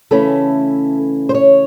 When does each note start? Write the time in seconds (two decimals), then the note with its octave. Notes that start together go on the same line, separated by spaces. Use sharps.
0.11 C#3 E3 A3 C#4 E4 A4
1.29 C5
1.34 C#5